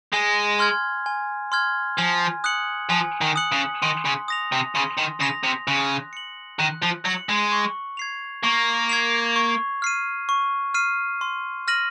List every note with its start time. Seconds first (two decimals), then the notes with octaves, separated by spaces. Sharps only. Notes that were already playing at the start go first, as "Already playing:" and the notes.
0.13 G#3 G#5
0.59 C6 F6 G#6
1.06 G#5
1.52 C6 F6 G#6
1.98 F3 G#5
2.44 D#6 F#6 C#7 F#7
2.90 F3 G#5
3.21 D#3
3.36 D#6 F#6 C#7 F#7
3.52 C#3
3.82 D#3 C6
4.05 C#3
4.28 D#6 A#6 F7
4.52 C3
4.75 C#3 C6
4.98 D#3
5.21 C#3 D#6 A#6 F7
5.44 C3
5.68 C#3 F#6
6.13 C#7 F#7
6.59 D#3 F#6
6.82 F3
7.05 F#3 C#7 F#7
7.29 G#3
7.52 C#6
7.97 G#6 C7 F7
8.43 A#3 C#6
8.89 G#6 C7 F7
9.36 C#6
9.82 F6 C7 D#7
10.29 C#6
10.74 F6 C7 D#7
11.21 C6
11.68 F6 A#6 D#7 F#7